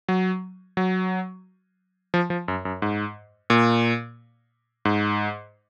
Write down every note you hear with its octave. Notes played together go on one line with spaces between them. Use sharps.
F#3
F#3
F3
F3
F#2
F#2
G#2
A#2
G#2